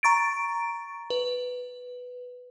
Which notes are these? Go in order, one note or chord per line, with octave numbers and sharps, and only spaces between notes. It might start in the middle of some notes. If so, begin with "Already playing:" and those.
A#5 C#6 A6 D7
B4